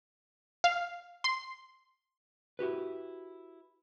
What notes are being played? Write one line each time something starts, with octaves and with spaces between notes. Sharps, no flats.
F5
C6
E4 F#4 G4 B4